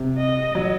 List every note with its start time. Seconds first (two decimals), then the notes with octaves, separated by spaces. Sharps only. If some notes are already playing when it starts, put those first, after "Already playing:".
Already playing: C3
0.17 D#5
0.55 F#3